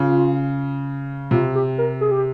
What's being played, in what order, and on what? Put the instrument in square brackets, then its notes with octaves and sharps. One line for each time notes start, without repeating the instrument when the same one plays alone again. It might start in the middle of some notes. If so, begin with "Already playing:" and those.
Already playing: [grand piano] C#3 [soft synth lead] F4
[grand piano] C3 [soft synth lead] F4
[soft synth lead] G4
A#4
G#4
G4